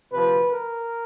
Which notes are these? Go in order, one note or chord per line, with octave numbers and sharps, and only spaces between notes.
D2 C3 F3 B4
A#4